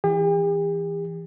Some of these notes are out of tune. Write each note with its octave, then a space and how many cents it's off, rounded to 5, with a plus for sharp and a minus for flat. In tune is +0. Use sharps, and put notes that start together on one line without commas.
E3 +0 G4 +45